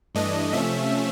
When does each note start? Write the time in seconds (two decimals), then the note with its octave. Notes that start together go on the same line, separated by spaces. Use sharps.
0.15 G2 E3 A3 D4 D#5
0.53 C3 F3 A3 C#4 E5